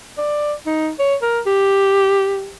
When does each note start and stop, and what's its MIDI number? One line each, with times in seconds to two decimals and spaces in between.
0.18 0.54 74
0.66 0.90 63
0.99 1.15 73
1.22 1.40 70
1.46 2.53 67